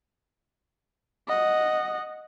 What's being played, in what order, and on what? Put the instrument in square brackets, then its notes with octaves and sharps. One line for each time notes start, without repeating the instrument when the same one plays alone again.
[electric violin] D#5 F#5